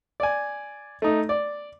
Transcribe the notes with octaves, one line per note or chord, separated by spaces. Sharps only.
D5 G#5
A3 D#4
D5